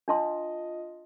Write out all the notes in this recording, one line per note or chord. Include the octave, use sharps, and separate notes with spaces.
D4 F4 D#5 A5 C6